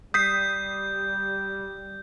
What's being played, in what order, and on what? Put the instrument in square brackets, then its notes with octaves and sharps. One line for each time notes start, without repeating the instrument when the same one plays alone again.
[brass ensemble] G3 [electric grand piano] D#6 B6 C7 [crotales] G6